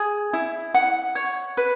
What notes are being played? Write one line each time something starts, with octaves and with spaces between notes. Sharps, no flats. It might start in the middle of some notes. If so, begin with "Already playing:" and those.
Already playing: G#4
E4
F#5
C#5
B4